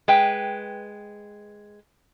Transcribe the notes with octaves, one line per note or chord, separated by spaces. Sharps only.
G#3 B4 G5